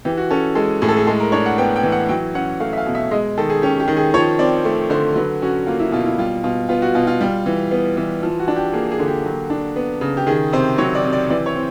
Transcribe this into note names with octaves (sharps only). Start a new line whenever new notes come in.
E3 G4
F#4
C#4 A4
G#3 A4
A2 G#4
A4
G#4
G#3 A4
A#4
D4 C#5
F#5
B3 G5
G5
E3
F#5
F#3 G5
C#4 F#5
A3 F5
E5
F5
B2
E5
G#3 D#5
D#3 A4
G#4
C#4 G4
G4
D#3
G#4
F3 C#5
C4 D5
A3
D3 C5
F#3 B4
C#4 F#4
A#3 F4
E4
B2 F4
E4
G3 F4
B2 F4
B3 F4
F#4
B2 F4
F4
G3
E3
B3
E3
F3
F#4
D4
G4
A#3 G#4
G#4
D3
G4
F#3
D4
B3
C#3
G4
D#3 G#4
C3 C5
F#3 C#5
D5
C3
D5
E3 D5
C#5
C4